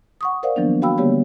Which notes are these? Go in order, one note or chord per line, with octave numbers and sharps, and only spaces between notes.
F#5 C#6 D#6
A#4 C5 D5 F5 F#5
D#3 F3 F#3 A#3 B3 D4
F#4 F5 G5 B5 E6
D3 G3 A#3 B3 G4 C#5